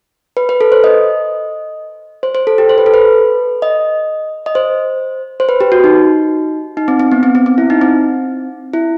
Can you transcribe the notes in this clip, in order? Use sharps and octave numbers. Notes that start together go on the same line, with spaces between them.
B4
B4
A4
C5
D#5
C5
C5
A4
G4
C5
B4
A4
B4
D#5
D#5
C5
C5
B4
G4
F#4
D#4
D#4
C4
C4
B3
C4
C4
C4
E4
D#4
C4
E4